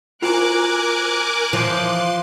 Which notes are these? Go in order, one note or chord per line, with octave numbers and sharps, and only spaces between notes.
F4 F#4 A#4 C5 G#5 D6 F#6 D7
E3 F3 C6